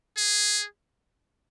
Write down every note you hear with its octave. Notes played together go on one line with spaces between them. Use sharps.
G#4